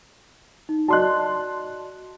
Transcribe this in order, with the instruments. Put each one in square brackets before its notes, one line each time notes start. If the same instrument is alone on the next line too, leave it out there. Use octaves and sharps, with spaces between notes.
[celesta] D#4
[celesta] F#4 D5 D#5 [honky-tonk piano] A5 C6 F#6